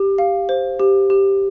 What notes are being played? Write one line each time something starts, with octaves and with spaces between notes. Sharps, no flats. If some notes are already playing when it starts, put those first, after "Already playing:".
Already playing: G4
F5
C5
G4
G4